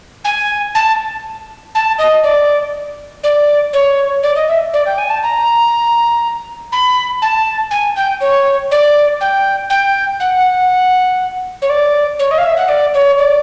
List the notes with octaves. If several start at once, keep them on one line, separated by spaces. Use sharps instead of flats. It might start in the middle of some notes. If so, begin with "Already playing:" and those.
G#5
A5
A5
D#5
D5
D5
C#5
D5
D#5
E5
D5
G5
G#5
A5
A#5
B5
A5
G#5
G5
C#5
D5
G5
G5
F#5
C#5
D5
C#5
D#5
F5
E5
F#5
D5
C#5
D5